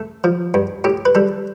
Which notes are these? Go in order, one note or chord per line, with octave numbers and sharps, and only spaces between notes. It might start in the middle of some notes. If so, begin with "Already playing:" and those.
Already playing: A3 A4
F3
G2
A2 G4
B4
G3 A4